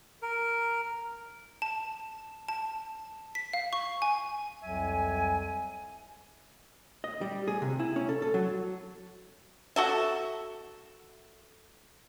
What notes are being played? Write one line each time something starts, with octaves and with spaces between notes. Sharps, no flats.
A#4
A5
A5
B6
F5
C#6
G#5
C2 F2 F#3 E5 G#5
D#5
G3
G#4
C3
E4
C#4
A4
A4
F#3
F#4 A4 E5